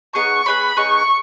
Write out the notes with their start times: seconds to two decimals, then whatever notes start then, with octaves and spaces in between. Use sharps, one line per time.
0.15 B3 D#4 G#4 C#5 C#6
0.46 B3 D#4 G#4 C#5 B5
0.76 B3 D#4 G#4 C#5 C#6